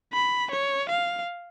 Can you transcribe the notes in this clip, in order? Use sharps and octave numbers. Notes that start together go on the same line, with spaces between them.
B5
C#5
F5